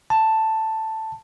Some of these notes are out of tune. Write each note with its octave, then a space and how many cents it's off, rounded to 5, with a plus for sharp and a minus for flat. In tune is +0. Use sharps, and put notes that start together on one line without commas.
A5 +5